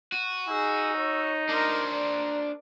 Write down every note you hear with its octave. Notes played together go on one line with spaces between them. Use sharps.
F#4 D#7
D#4 G#4 E6
C#5
D4 A#4 C5 D6
D5 A#5